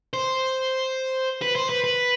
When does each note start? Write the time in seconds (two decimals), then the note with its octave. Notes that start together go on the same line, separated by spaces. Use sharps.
0.13 C5
1.42 B4
1.55 C5
1.69 B4
1.84 B4